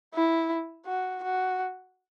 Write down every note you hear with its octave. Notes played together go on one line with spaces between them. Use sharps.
E4
F#4
F#4